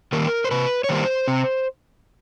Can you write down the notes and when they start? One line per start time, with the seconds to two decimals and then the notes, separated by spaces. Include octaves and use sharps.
0.12 D#3 G3 A#3 A#4
0.44 C5
0.51 C3 B4
0.84 C#5
0.89 D#3 G3 A#3 C5
1.28 C3